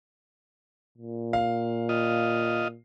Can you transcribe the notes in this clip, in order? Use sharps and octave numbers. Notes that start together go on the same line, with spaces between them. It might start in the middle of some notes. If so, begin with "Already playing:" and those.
A#2
F5
F4 D#5